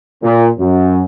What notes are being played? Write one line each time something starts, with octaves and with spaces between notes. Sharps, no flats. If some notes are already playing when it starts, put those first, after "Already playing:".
A#2
F#2